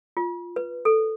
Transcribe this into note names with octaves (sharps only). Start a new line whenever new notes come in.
F4
B4
A4